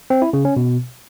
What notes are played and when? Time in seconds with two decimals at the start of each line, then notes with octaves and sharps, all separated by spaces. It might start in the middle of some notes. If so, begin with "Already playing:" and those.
0.10 C4
0.22 E4
0.33 C#3
0.45 C#4
0.56 B2